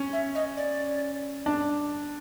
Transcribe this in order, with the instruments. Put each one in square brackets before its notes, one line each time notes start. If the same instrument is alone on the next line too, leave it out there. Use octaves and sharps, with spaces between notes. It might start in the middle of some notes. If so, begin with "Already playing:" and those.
Already playing: [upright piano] C#4
[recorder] E5
D#5
D5
[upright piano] D4